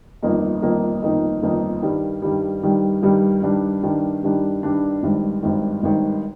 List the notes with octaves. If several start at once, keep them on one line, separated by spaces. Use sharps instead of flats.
G1 F2 D#3 A#3 D#4
G1 F2 D#3 A#3 D#4
G1 F2 D#3 A#3 D#4
G1 F2 D#3 A#3 D#4
G2 D#3 G3
G2 D#3 G3
G2 D#3 G3
G2 D#3 G3
G2 D#3 G3 D4
G2 D#3 G3 D4
G2 D#3 G3 D4
G2 D#3 G3 D4
G#1 G2 D#3
G#1 G2 D#3
G#1 G2 D#3